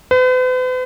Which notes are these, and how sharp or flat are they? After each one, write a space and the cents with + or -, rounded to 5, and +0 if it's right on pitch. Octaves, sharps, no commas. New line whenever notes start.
B4 +45